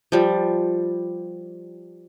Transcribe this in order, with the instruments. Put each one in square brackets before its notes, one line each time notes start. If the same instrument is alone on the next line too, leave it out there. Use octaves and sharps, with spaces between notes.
[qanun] F3 G3